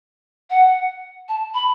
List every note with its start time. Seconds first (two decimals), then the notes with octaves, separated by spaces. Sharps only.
0.50 F#5
1.29 A5
1.54 B5